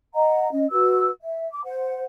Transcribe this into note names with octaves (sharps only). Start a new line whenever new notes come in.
D#5 F#5 A#5
C#4 D#5
F#4 B4 E6
E5
D6
C5 F#5